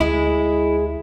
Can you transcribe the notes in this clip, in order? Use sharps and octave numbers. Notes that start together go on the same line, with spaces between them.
D2 G#3 E4 G#4